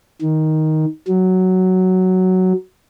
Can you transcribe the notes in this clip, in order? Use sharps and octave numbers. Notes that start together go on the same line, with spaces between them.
D#3
F#3